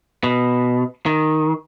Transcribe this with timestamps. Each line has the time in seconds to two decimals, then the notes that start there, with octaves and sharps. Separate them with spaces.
0.24 B2
1.06 D#3